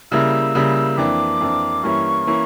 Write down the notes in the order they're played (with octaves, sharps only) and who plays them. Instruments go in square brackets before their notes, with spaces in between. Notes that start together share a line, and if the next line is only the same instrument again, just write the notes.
[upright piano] C#3 G3 A#3 E4 [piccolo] E6
[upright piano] C#3 G3 A#3 E4
[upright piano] F2 E3 A#3 D4 [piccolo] D6
[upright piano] F2 E3 A#3 D4
[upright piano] G2 E3 A#3 C#4 E4 [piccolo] C#6
[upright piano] E3 A#3 C#4 E4